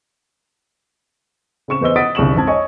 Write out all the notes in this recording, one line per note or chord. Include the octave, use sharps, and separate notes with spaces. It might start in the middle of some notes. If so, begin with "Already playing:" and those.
C#3 C4 C#6 E7
E2 B4 C5 D#5 E6 G7
D#5 F#5 D#6 A6 B6 D7
G1 C2 C#3 C#6 E7 F#7
G#1 F2 A5 G#6
C#5 D#5 G#5 C#6